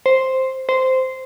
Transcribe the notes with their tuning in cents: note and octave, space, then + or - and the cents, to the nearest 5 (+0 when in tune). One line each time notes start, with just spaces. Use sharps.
C5 +0
C5 -10